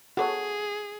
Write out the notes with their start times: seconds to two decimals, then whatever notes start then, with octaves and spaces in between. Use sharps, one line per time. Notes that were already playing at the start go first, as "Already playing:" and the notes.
0.17 F#4 G#4 A4 C#5